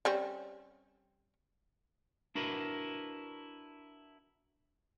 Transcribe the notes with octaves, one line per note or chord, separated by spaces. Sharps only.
G3 C4 C#4
D4 E4 F#4 A#4 B4